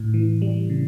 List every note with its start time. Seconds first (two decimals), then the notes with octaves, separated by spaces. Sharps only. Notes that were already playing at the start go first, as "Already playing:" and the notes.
Already playing: A2
0.14 E3
0.42 G3
0.70 C#3